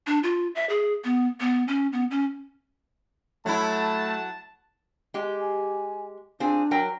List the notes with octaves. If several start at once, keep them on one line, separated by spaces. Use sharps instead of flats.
D4
F4
E5
G#4
B3
B3
C#4
B3
C#4
F#3 A3 E4 A5
G#3 G4
G#5
C4 D4 F4 G#4
F#3 A#4 G5